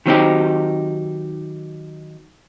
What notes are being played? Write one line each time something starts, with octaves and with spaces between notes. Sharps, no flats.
D#3 F#3 B3 C4 D#4 G4